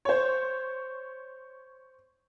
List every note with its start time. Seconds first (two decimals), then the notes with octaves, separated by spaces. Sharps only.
0.05 C5 C#5